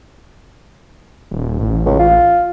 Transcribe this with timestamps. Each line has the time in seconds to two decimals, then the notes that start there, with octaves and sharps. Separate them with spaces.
1.31 D#1
1.59 A1
1.86 C#2
1.99 F4